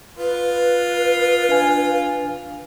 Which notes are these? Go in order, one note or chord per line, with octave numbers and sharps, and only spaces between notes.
F4 B4
D4 F5 G#5